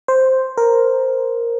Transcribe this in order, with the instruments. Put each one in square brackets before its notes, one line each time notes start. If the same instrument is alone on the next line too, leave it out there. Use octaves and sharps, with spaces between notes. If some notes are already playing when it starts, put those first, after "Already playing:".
[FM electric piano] C5
A#4